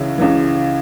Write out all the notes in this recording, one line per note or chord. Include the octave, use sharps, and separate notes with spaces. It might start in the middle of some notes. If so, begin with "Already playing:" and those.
Already playing: C#2 C#3 E3 C#4 E4
C#2 C#3 E3